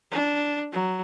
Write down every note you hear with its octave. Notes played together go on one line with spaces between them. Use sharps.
D4
F#3